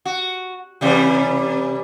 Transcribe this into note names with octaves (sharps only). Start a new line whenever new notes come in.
F#4
C3 E3 G3